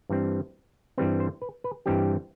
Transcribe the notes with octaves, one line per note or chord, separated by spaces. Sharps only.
G2 E3 G3 C4
G2 E3 G3 C4 B4
C5
B4
B4
G2 E3 G3 C4 G4